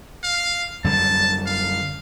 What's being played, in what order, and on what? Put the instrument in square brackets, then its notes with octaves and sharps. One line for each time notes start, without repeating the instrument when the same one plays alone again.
[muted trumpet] F5
[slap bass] F#2 D3 G3 [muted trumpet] A5
[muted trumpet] F5